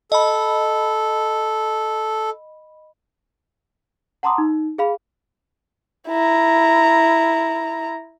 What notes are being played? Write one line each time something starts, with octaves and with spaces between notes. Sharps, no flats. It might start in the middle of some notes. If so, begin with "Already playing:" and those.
A4 D#5 B5
F#5 A5 A#5 C6 D6 D#6
D#4
G#4 F5 B5
E4 A#5